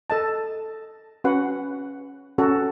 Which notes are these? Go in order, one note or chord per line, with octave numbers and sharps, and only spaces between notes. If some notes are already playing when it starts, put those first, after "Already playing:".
A4 D#5 A5
C#4 F#4 B4 F#5
C#4 F#4 A4